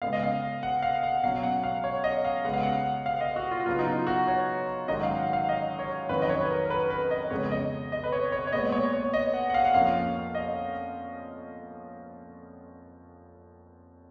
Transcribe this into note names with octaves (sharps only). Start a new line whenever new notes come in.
C#3 G#3 B3 F5
D#5
F5
F#5
F5
F#5
B2 F#3 C#4 F5
F#5
F5
C#5
D#5
F5
C#3 G#3 B3 F#5
F5
F#5
F5
D#5
F#4
F4
C#3 F#3 B3 F4
D#4
F4
F#4
C#5
G#2 D#3 F#3 C#4 D#5
F5
F#5
F5
D#5
C#5
F2 D#3 F#3 C#4 B4
D#5
C#5
B4
A#4
A#4
B4
B4
D#5
F2 C#3 G#3 B3 C#5
D#5
D#5
B4
C#5
C#5
C#5
A#2 G#3 B3 D#5
C#5
C#5
D#5
F#5
F#5
F5
F#5
F2 F3 A#3 C#4 F5
D#5